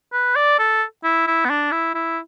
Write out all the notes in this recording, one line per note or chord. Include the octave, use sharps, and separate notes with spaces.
B4
D5
A4
E4
E4
B3
D4
E4
E4